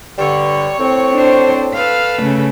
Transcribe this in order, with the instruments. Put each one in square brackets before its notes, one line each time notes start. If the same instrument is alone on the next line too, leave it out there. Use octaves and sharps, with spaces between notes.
[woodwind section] G2 D3 [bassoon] G3 [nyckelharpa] C#5 C#6
[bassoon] A2 [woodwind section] C4
[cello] D4 C5
[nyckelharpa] A4 B4 [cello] F5
[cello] C#3 A3